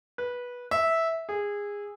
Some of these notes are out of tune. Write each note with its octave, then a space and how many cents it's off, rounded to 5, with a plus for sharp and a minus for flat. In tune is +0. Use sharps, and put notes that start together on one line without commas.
B4 -15
E5 -10
G#4 -20